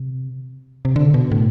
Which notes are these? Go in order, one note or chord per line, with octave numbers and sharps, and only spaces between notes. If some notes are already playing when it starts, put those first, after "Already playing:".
Already playing: C3
C3
D3
B2
A2